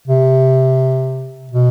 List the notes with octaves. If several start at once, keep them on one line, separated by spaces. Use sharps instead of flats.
C3
B2